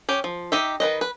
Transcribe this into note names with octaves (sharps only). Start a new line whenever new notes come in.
C#4 G4
F3
D#4 G4 E5
D#3 B4 D#5
B4